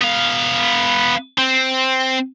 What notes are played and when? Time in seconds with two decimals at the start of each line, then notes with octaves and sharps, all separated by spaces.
0.02 B3 F5
1.38 C4